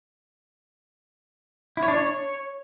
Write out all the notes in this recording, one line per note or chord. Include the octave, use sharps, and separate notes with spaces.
E4
C#5
D4
C#5